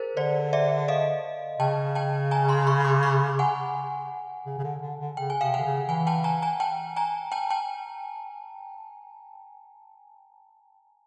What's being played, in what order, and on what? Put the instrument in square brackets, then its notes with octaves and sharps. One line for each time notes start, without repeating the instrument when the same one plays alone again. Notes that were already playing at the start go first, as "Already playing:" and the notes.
Already playing: [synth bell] G#4 A#4 C5
[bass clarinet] D3 [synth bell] C5 D5
[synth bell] D5 E5
D#5 F5
[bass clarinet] C#3 [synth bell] G5 A5
[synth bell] G5 A5
G#5 A#5
A#5 C6
B5 C#6
C6 D6
B5 C#6
F#5 G#5
[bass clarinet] C#3
C#3
D3
D3
D3
[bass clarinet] C#3 [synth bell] G5
[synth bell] G#5
[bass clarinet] C3 [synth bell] F5 G5
[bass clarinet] D3 [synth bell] F#5 G#5
[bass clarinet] C#3
[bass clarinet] E3 [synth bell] F#5 G#5
[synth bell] G5 A5
G#5 A#5
G#5 A#5
G5 A5
G#5 A#5
G5 A5
G5 A5